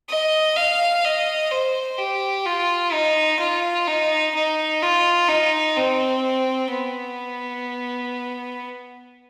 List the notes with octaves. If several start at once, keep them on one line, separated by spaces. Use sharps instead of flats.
D#5
F5
D#5
C5
G4
F4
D#4
F4
D#4
D#4
F4
D#4
C4
B3